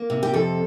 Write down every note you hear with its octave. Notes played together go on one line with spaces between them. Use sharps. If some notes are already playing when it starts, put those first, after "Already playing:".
Already playing: A#3
C3
G4
F2 A4